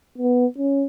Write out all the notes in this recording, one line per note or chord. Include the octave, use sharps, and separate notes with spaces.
B3
C#4